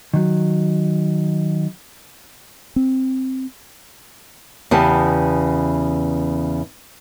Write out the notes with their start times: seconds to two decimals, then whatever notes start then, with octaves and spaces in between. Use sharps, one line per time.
0.14 D#3 F#3
2.76 C4
4.71 E2 C#3 B3 G4 A5